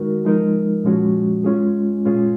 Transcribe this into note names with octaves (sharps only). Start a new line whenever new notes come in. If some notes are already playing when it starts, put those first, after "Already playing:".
Already playing: D#3 G#3 D#4 F#4 A#4
F3 G#3 D#4 A#4
A#2 F3 G#3 C#4 F#4
G#3 C#4 F4 G#4
A#2 G#3 C#4 F4 G#4